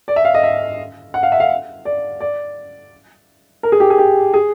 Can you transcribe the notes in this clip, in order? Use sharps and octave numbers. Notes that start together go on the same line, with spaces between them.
D5
E5
F5
D#5
E5
F#5
F5
E5
F5
D5
D5
A#4
G#4
G4
G#4
G4
G#4